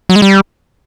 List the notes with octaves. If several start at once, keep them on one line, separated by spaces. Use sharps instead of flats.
F#3
G#3
G3